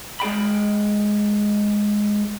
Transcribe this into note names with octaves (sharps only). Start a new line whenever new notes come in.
G#3 G#4 G5 B5